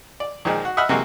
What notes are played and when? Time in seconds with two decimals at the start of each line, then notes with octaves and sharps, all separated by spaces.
0.20 D5
0.45 A#2 D#3 F3 G#3 D#4
0.65 F#4
0.77 D#5 E5 F#5 B5 E6 F6
0.89 C3 E3 F#3 G#3 A#3